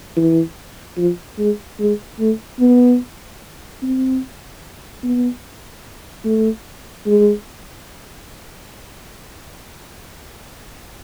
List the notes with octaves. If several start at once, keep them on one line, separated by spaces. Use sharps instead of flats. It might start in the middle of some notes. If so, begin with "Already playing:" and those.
E3
F3
G#3
G#3
A3
B3
C4
B3
A3
G#3